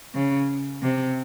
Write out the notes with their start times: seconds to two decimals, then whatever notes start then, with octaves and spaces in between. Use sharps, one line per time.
0.14 C#3
0.82 C3